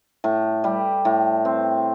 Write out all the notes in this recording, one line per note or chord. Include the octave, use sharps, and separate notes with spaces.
A2
G3
A2
C4